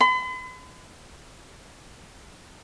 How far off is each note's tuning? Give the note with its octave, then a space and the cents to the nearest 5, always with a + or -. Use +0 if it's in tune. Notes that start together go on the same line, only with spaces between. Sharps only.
B5 +45